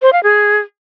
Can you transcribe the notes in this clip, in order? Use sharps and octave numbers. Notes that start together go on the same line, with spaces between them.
C5
F5
G#4